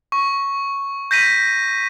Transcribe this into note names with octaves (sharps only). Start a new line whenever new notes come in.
C#6
G6 A#6 B6 D#7